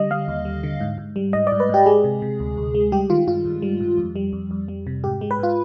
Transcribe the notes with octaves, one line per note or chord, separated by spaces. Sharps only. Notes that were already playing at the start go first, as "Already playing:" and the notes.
Already playing: D3 G3 D#5
G3 F5
D#2
G3
D3
G#2
G#2
G3
G#2 D#5
D5
G#2
B4
G#2 G4
G#3 G#4
C3
C3
D2
D2
G#3
G3 G4
D#3 F4
G2 F4
G2
G3
G2
F2
G3
F2
F2
G3
C3
G#2 G4
G#3
B4
G#2 F4